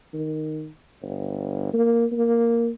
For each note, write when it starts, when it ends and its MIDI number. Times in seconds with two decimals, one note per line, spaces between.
0.13 0.69 51
1.02 1.71 31
1.74 2.05 58
2.12 2.70 58